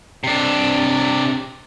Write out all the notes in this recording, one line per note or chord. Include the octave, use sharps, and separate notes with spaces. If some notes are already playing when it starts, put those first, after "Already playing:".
C3 D4